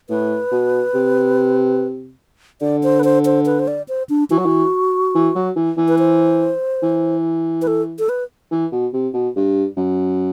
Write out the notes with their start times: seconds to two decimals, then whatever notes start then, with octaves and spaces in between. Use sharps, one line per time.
0.10 A2 B4
0.52 B2
0.94 C3
2.62 D3 D5
2.83 C5
3.00 B4
3.04 C5
3.25 C5
3.46 B4
3.59 C5
3.68 D5
3.88 C5
4.09 D4
4.31 E3 F#4
4.39 F#3
4.45 E3
5.15 E3
5.35 F#3
5.56 E3
5.77 E3
5.88 B4
5.99 C5
6.83 E3
7.62 B4
7.67 A4
7.99 A4
8.09 B4
8.51 E3
8.72 B2
8.93 C3
9.14 B2
9.36 G2
9.77 F#2